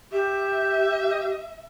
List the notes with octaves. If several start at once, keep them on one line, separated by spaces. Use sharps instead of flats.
G4 E5